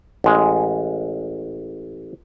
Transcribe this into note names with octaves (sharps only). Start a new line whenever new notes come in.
A1 G#3